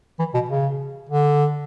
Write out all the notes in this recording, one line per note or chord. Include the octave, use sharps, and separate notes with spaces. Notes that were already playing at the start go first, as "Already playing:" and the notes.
E3
B2
C#3
D3